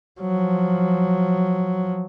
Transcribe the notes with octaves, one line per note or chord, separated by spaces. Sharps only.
F3 F#3